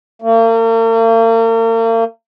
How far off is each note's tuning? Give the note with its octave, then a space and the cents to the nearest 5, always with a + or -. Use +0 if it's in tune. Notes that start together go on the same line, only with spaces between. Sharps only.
A#3 -40